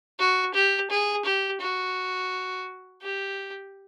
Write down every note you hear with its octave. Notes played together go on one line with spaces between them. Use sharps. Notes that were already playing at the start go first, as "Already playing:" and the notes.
F#4
G4
G#4
G4
F#4
G4